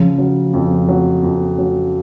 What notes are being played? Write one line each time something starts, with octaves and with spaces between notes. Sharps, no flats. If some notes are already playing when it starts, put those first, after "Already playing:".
Already playing: C#3 F3
F#3
F2
F#3
F2
F#3